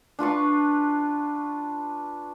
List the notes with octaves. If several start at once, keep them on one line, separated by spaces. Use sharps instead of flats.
D4 F4 B4 C#6